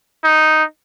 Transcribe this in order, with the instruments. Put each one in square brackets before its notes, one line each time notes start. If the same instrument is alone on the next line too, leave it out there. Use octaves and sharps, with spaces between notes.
[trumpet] D#4